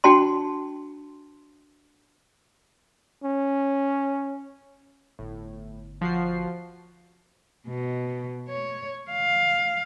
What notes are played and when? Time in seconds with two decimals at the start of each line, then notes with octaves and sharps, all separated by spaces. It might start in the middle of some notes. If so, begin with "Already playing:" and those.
0.04 D4 F#4 G5 A5 C6
3.24 C#4
5.19 G1 A2
6.01 F3 F#4 C7
7.68 B2
8.49 C#5
9.11 F5